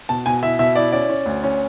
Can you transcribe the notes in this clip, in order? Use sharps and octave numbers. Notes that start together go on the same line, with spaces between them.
B2 A5
B2 G#5
E4 E5
B2 E5
E4 D5
C#4 D5
C#4
D2
C#4